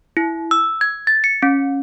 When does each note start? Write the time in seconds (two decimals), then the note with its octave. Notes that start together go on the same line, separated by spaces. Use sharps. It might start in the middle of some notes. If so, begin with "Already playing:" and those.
0.17 E4
0.51 E6
0.81 G#6
1.07 A6
1.24 C#7
1.43 C#4